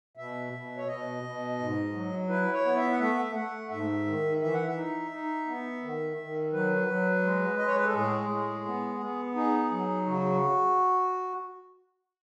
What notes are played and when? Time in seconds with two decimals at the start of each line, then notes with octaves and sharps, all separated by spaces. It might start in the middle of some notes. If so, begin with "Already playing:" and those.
0.17 B2 E5
0.53 B2
0.77 C#5
0.88 B2 D#5
1.23 B2
1.59 G#2
1.94 F#3
2.29 E4 B4
2.53 C#5
2.65 B3
2.76 E5
2.92 F#5
3.00 A3 E5
3.35 A3 F#5
3.70 G#2 E5
4.06 D#3
4.41 E3 E5
4.54 F#5
4.67 E5
4.76 D#4
5.11 D#4
5.47 B3
5.82 D#3
6.17 D#3
6.53 F#3 B4
6.88 F#3
7.24 G#3
7.58 G#3 D#5
7.67 C#5
7.77 B4
7.85 A4
7.94 A2 G#4
8.30 G#3
8.65 B3
9.00 B3
9.35 D#4 G#4
9.71 F#3
10.06 C#3 F#4